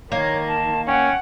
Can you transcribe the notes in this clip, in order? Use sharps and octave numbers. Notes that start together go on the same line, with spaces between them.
D#3 A#3 C#5
A5
C#4 F#5 G5